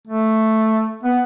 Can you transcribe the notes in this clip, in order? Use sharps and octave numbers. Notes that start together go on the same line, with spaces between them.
A3
B3